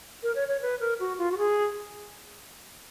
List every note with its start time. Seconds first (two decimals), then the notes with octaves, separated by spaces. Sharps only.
0.23 A#4
0.35 C#5
0.48 C#5
0.62 B4
0.80 A#4
1.00 F#4
1.18 F4
1.32 F#4
1.38 G#4